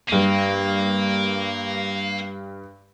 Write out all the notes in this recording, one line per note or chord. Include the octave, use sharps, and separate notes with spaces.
G2 A#3 D#7